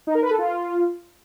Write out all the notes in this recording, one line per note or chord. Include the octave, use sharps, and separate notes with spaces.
D#4
A#4
B4
A4
F4